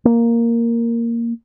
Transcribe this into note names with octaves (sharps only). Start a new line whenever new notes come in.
A#3